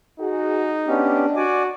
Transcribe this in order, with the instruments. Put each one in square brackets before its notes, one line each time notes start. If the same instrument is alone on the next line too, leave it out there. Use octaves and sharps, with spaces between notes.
[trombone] D#4 [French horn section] F#4 G#4
[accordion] B3 C#4 G4 [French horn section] D4 D#5
[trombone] F#4 [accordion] D5 G#5 D6